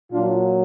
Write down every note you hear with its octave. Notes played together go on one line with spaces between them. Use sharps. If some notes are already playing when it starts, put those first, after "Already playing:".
A#2 F#3 D4 F4